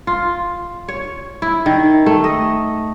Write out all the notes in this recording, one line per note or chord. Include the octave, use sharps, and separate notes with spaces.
F4
C#5
E4
D#3
A3
D#5